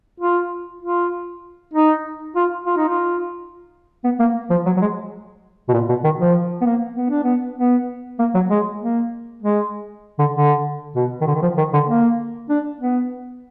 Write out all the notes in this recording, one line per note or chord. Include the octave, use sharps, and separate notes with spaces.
F4
F4
D#4
F4
F4
D#4
F4
B3
A#3
F3
F#3
F#3
G#3
B2
A#2
B2
D#3
F3
B3
A#3
B3
D4
B3
B3
A#3
F#3
G#3
A#3
G#3
D3
D3
B2
D#3
D3
D#3
F3
D#3
D3
A#3
D4
B3